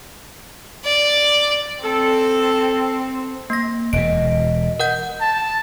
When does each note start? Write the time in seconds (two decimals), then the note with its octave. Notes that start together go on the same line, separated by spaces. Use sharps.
0.85 D5
1.84 C4 A4
3.50 A#3 A#6
3.93 E1 B2 D#5 D7
4.80 A#4 F#5 G6
5.21 A5